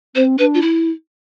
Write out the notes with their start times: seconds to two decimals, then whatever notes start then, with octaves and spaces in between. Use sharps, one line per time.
0.15 C4 C5
0.39 D4 B4
0.54 F4
0.62 E4